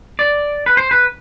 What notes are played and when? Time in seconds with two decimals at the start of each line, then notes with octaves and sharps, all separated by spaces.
0.19 D5
0.66 B4
0.77 C5
0.91 B4